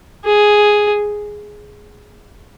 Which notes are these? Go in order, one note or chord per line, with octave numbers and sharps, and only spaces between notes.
G#4